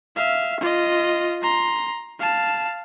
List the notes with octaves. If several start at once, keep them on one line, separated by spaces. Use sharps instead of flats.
E5 F5
F4 D#5
A#5 C6
F5 A5